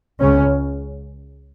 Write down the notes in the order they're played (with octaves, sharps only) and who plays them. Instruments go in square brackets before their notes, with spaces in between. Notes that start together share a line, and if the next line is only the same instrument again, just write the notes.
[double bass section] C#2 C#3 C#4